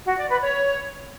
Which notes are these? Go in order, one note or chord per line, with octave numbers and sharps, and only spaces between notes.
F#4
D5
B4
C#5